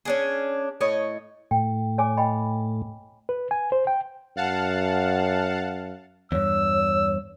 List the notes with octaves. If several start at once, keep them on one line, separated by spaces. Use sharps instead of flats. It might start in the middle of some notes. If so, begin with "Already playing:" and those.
C#4 D4 G#4
A2 C#5 D#5
A2 G5
C#5 G#5 D6
D#5 G5 B5
B4
G#5
C5
G5
F#2 F5 F#5 A5
E2 G2 C#5 E6